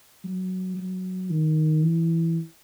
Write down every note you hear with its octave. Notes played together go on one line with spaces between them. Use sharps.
F#3
F#3
D#3
E3